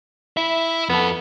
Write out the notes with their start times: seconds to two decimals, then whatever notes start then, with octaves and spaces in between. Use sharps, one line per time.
0.37 E4 E5
0.89 F2 B3 A4